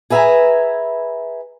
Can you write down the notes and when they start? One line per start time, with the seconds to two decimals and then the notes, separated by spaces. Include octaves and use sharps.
0.10 G#4 B4 E5 F#5 G#5 A#5